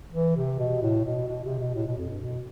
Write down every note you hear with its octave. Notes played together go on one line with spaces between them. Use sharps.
E3
C3
B2
A2
B2
B2
C3
B2
A2
B2
F2
G2
B2